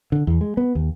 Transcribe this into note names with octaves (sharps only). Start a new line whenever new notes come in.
D3
E2
G#3
B3
D#2